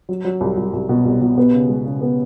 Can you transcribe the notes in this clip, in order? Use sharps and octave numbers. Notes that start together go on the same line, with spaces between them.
F#3
F#3
C2
C2
C2
B2
C2
B2
B3
C#3
G#3
C#3
B3